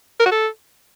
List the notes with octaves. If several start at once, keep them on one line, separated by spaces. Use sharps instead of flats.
A#4
F#4
A4